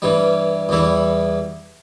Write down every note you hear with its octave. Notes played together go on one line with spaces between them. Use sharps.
G2 E3 G3
E2 E3 G3 E4